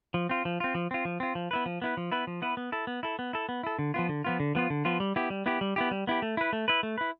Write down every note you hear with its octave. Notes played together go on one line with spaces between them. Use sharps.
F3
C4 F4
F3
C4 F4
F3
C4 F4
F3
C4 F4
F3
B3 E4 B4
F3
B3 E4 B4
F3
B3 E4 B4
F3
B3 E4 B4
B3
E4 A4
B3
E4 A4
B3
E4 A4
B3
E4 A4
D3
F3 B3 F4
D3
F3 B3 F4
D3
F3 B3 F4
D3
F3 B3 F4
G3
B3 E4 G4
G3
B3 E4 G4
G3
B3 E4 G4
G3
B3 E4 G4
A3
E4 B4
A3
E4 B4
A3
E4 B4